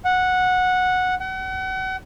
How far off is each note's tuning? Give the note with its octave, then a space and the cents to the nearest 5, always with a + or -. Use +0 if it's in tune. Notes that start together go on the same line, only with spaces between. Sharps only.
F#5 -10
F#5 +35